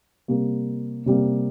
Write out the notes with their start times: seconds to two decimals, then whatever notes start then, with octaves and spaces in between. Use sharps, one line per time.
0.28 C3 G3 A#3
1.06 C3 G3 A#3